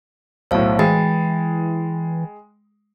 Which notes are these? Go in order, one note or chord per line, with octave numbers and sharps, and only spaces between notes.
B1 A2 C5 F5
E3 G#3 G5 B5 A6